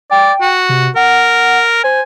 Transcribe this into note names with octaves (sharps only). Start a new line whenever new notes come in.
D5 G5
F#4
C3
A#4 F#5
C5 G#5